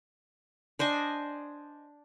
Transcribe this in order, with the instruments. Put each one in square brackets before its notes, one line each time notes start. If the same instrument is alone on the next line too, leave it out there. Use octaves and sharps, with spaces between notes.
[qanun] D4 C5 D#5 G#5